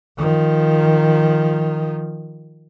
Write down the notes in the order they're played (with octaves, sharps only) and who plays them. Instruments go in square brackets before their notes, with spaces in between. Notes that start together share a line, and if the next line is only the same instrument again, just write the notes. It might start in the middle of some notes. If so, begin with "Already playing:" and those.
[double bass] D#3 F3